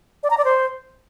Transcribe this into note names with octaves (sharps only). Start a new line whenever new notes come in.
D5
A#5
D5
C5